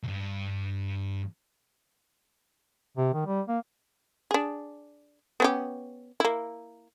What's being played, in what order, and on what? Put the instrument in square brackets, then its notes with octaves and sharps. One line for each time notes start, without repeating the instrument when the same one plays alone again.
[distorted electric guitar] C2 G2
[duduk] C3
D#3
G3
A#3
[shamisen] D4 G#4
B3 C#4 G4
A#3 E4